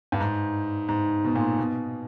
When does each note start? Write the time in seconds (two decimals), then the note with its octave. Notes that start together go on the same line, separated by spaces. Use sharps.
0.12 G2
0.21 G#2
0.89 G#2
1.24 B2
1.35 A#2
1.58 B2